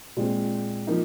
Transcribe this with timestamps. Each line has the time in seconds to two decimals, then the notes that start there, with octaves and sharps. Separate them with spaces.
0.17 A#2 G#3 C4
0.87 F3 A#3 D#4